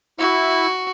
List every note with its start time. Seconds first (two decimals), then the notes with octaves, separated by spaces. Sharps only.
0.19 E4 F#4